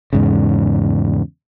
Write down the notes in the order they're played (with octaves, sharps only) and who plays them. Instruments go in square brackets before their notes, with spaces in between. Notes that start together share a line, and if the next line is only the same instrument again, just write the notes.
[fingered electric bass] E2 G#2 C#3